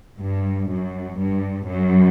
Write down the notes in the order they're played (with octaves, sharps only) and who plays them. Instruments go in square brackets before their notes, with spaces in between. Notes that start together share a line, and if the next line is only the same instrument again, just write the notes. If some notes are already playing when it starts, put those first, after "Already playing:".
[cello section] G2
F#2
G2
F#2